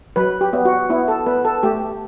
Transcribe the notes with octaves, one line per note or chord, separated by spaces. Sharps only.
F#3 B4
G4
B3
F#4
B3 E4
A4
B3 B4
A4
A3 G4